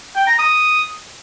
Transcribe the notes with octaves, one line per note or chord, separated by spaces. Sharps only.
G5
A#5
D#6